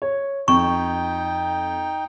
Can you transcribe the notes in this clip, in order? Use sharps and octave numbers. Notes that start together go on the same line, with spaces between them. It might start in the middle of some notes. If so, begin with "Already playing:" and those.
C#5
F2 D#4 G5 C#6